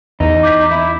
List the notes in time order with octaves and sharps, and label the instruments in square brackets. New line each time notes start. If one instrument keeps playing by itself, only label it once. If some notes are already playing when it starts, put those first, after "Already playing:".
[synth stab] E2 [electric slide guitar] D#4
[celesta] D6 G6 B6
[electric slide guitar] E4